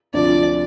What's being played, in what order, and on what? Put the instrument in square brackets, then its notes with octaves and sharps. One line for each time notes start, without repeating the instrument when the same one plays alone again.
[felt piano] D2 C3 F3 D4 F4 [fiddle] D5